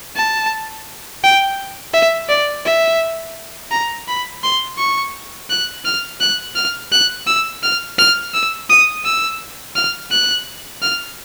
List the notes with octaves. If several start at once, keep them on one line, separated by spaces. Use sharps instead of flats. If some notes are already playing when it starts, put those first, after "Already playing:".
A5
G5
E5
D5
E5
A#5
B5
C6
C#6
F#6
F6
F#6
F6
F#6
E6
F6
F6
E6
D#6
E6
F6
F#6
F6